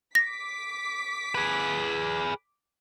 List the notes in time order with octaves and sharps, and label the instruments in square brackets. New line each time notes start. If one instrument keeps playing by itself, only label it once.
[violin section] D6 B6 [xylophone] A#6
[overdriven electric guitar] G#4 B4